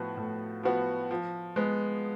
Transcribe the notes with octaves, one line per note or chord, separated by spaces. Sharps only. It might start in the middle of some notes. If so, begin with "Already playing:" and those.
Already playing: A2 F3 B3 F#4
A2
F3 B3 F#4
F3
G#3 B3